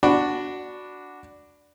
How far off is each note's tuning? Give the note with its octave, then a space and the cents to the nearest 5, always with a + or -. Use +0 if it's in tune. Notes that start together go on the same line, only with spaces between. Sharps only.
D4 +0 F#4 +0 B5 +0